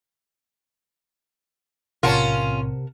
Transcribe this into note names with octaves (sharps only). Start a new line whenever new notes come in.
B1 A2 C3 C#4 F4 A#4 F#5 A5